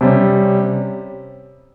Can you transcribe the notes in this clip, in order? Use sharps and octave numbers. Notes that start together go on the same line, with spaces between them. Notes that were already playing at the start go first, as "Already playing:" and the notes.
C3 G3 C#4